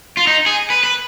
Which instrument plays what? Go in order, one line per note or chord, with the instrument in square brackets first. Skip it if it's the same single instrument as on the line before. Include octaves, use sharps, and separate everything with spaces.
[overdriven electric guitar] F4
D#4
G#4
B4
B4